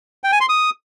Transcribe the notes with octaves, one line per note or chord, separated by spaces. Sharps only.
G5
G#5
C6
D#6